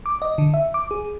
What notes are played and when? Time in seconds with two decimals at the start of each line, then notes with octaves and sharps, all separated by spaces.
0.06 D6
0.22 D#5
0.38 D3
0.54 E5
0.74 D6
0.91 G#4